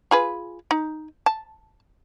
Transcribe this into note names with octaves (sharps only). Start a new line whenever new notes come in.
F4 G#4 B4
D#4
A5